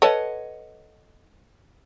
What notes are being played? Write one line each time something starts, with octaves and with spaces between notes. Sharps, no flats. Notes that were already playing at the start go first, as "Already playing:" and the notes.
A4 B4 C#5 D#5 F#5 A5